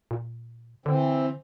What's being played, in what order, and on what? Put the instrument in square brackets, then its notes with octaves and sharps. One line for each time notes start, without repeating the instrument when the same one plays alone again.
[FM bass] A#2
[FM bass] D3 [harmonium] E3 C4